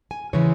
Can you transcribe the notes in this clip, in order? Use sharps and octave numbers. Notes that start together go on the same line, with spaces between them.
G#5
C#3 E3 G#3 C#4 C#5